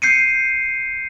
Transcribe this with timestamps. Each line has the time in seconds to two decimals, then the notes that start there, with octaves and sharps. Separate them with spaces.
0.02 G6 C7 C#7 D#7